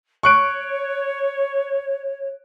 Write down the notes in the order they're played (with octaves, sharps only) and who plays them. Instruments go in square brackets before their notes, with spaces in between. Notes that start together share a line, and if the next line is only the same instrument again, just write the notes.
[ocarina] C#5 [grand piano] C#6 F#6 D7